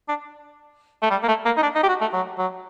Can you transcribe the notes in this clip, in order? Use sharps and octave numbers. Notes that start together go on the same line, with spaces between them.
D4
A3
G3
A#3
A3
A#3
D#4
D4
D#4
G4
F#4
A3
F#3
F#3